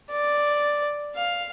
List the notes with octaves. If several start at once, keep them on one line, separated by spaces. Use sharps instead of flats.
D5
F5